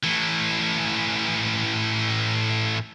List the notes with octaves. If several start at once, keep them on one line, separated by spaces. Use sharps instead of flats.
A2 E3